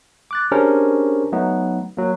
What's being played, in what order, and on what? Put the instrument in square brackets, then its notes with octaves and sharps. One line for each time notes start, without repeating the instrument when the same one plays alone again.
[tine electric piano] D6 F#6 A6
C#4 D4 G4 G#4 A#4 C5
F#3 A3 B3 D#4 B4
F#3 A#3